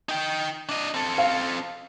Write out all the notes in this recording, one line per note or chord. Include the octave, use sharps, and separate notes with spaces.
D#4 G5
D4 D#5
C4 A4
F5